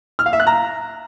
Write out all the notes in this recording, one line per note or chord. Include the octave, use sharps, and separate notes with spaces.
F6
F5
E5
F#6
A#5